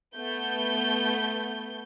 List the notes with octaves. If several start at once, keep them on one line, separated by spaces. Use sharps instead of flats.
A3 B3 G6